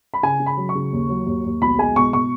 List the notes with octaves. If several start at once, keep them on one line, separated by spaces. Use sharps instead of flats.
B5
C#3 G#5
C#3
B5
F#3
C#6
C#3
D#2
F#3
D#2
D#2
B1 B5
G#3 G#5
B2 C#6
B2 C#6